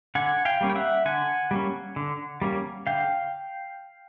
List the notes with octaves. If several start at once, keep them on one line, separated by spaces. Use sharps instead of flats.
D3 F#5 G#5
F5 G5
G3 A#3 C#4
G5
E5 F#5
D3 F#5 G#5
G3 A#3 C#4
D3
G3 A#3 C#4
D3 F5 G5